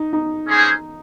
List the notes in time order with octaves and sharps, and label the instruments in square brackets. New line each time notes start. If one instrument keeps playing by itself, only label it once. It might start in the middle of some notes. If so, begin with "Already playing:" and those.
Already playing: [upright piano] D#4
D#4
[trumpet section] A#3 C#4 E4 G#4 C5